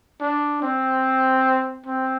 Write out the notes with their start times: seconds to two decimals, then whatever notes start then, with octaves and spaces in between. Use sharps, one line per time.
0.21 D4
0.62 C4
1.86 C4